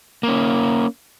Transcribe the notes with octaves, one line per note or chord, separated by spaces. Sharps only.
A#3 C#4